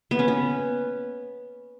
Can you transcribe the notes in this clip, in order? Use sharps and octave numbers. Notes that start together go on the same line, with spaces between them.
B3
C#4
B3